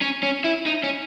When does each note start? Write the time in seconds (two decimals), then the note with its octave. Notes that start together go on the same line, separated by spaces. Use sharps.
0.01 C#4
0.23 C#4
0.45 E4
0.66 D#4
0.83 C#4